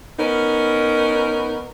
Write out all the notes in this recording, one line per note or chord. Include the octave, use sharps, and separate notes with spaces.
B3 C#4 D#4 A#4